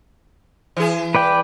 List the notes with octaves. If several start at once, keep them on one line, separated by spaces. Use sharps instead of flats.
E3 G#4
B4 D5 G5